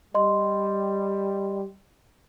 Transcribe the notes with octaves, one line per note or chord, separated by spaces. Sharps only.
G3 D#5 C6